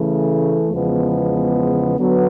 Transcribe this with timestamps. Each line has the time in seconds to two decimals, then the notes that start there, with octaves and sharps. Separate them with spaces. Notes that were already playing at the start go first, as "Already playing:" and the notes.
Already playing: C#3 E3 A3
0.71 E2 C#3 F3 G#3 B3
1.99 D3 F#3 B3